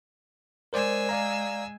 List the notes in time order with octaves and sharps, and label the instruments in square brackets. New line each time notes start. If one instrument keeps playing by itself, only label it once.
[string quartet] G#3 G#5 E6 [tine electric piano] A#4 C5 D5
[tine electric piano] D5 F5 A#5